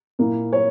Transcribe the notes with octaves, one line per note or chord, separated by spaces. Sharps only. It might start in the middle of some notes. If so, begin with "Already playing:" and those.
A#2 A#3 E4
C#5